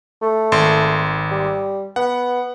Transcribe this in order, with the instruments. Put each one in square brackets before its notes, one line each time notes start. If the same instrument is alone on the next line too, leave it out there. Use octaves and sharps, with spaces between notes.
[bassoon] A3
[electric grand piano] G#1 C6
[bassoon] G3
[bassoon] B3 [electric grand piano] F#5